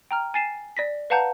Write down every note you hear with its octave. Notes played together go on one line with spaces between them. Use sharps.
G5 A#5 F6
G#5 A6 C7 D#7 E7
D5 A#6 B6
B4 F5 F#5 A5 A#5 G6